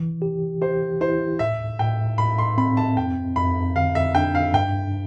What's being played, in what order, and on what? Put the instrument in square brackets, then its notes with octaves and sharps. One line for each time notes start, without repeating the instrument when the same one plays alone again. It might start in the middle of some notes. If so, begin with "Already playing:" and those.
Already playing: [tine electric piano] E3
G4
[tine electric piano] G4 [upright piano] C5
[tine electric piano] E4 [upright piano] C5
[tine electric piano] A2 [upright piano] E5
[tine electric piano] A2 [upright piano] G5
[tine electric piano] A2 [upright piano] B5
[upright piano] C6
[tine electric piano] C4 [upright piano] B5
[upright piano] A5
[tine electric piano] F2 [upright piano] G5
[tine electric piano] F2 [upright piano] B5
[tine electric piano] D3 [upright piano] F5
[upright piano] E5
[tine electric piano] D4 [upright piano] G5
[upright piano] F5
[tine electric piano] G2 [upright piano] G5